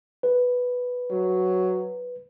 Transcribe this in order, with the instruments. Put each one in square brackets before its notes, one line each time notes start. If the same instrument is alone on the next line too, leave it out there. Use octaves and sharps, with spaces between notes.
[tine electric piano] B4
[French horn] F#3